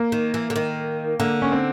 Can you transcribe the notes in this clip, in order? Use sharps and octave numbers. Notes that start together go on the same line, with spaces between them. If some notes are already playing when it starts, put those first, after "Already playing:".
Already playing: A#3
D#3
E3
D3
D#3
D3 A#3
C#4
C4